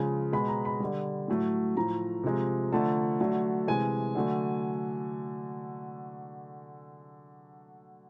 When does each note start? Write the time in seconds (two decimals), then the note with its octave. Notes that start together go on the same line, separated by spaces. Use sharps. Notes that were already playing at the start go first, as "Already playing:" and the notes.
Already playing: C#3 F3 G#3
0.32 B2 G#3 B5
0.48 A#5
0.65 B5
0.80 D3 G3
1.28 A2 F#3 A3
1.76 A2 F3 A3 A#5
2.24 C3 F3 G#3
2.72 D3 F3 A3 A5
3.20 D3 F#3 A3
3.68 C3 E3 G#3 G#5
4.15 D3 F#3 A3